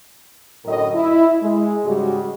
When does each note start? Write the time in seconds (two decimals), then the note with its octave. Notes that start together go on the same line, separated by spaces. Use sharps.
0.66 F#2 A2 D3 A#4 D#5
0.95 E4
1.42 G#3
1.84 G#2 C#3 G3 G#3 F#4